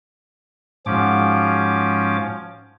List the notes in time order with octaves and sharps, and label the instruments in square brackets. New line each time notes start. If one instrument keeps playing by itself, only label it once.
[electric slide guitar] G#2 F#4 [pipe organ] F3 C#4 D6